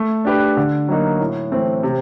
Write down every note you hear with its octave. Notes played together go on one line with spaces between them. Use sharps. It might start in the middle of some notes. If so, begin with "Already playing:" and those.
Already playing: A3
D4 G4 B4
D3
F#3 A#3 D#4 F#4
A2
E3 A3 C4
C3